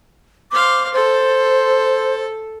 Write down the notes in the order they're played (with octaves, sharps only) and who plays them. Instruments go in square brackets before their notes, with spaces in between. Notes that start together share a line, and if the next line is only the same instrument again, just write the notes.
[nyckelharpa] C5 F5 [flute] D6
[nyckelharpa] A4 [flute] C5